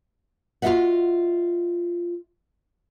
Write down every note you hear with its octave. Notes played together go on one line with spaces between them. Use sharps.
F4 F#4 A4 D#5 E5 F#5